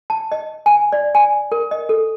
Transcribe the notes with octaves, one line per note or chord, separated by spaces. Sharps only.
A5
D#5
G#5
D5
G#5
A#4
D#5
A4